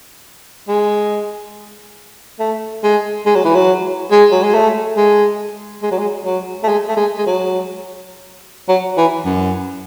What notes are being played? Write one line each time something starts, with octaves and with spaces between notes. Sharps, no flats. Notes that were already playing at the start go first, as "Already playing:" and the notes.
G#3
A3
G#3
G#3
F#3
E3
F#3
G#3
F#3
G#3
A3
G#3
G#3
F#3
G#3
F#3
A3
G#3
A3
G#3
G#3
F#3
F#3
E3
F#2